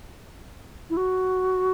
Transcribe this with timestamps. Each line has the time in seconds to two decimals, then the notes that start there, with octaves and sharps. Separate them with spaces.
0.90 E4
0.97 F#4